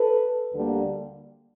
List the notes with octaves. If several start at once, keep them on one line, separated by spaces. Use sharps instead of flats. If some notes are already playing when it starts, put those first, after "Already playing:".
Already playing: A4 B4
D2 D3 G3 A#3